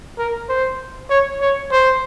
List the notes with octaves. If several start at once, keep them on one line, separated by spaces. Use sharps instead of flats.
A#4
C5
C#5
C#5
C5